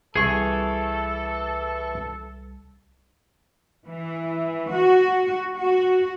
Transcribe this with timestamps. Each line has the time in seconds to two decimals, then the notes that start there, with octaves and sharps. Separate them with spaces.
0.16 C2 E3 G3 G#4 A4 C#6
3.86 E3
4.70 F#4
5.55 F#4